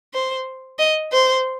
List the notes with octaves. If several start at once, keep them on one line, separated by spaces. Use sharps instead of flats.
C5
D#5
C5